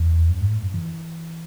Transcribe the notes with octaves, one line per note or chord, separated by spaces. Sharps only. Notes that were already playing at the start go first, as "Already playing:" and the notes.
Already playing: E2
F#2
G#2
A2
F#2
E3